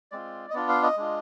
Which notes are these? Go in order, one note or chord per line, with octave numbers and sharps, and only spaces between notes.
G#3 C4 F4 D5
D#5
B3 D4 F4 D5
F5
D#5
G#3 D4 F4